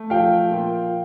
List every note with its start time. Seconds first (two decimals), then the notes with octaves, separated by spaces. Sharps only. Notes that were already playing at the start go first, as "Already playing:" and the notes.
Already playing: A3
0.10 F3 F5 G5
0.51 A#2